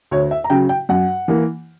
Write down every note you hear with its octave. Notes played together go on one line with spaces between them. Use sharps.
D2 C#5
E5
A#5
C#3 F#3 G5
G5
F#2 F#5
E3 A#3